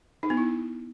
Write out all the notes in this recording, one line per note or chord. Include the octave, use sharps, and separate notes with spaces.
D#4
B3
E4